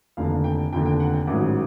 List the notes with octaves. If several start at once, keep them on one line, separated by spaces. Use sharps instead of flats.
F1 D#2 D3 F5
G5
F1 D#2 D3 G5
G5
F#5
G5
A1 G#2 D#3 F#3 F#5